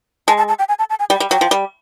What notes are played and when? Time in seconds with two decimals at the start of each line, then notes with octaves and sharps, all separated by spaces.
0.28 G#3 A5
0.38 A5
0.48 A5
0.59 G5
0.69 G#5
0.79 A5
0.90 A5
1.00 G#5
1.10 G3 G5
1.20 G3
1.31 F#3 G5
1.41 F3
1.51 G3